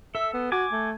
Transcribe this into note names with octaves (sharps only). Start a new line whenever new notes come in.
A4 E5
B3
F#4 G#5 D6
A3